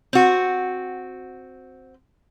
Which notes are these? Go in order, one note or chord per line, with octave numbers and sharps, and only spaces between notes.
C4 F#4